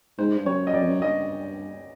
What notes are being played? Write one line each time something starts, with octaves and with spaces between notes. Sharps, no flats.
G#2 C5
G2
F#2 C#5
D#5
F#2 D5
F2
F#2
G2 D#5